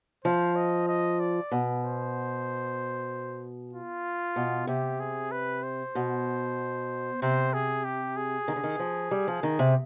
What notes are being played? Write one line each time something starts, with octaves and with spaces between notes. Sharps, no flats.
F3 C5
D#5
D#5
D5
B2
C5
F4
B2
C3 G4
G#4
B4
C5
B2
C3 C5
G#4
G4
G#4
D#3
D3
D#3
F3
G3
F3
D#3
C3